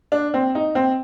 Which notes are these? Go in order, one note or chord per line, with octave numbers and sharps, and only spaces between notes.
D4
C4
D#4
C4